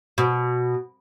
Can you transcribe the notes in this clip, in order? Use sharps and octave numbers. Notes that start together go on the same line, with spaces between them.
B2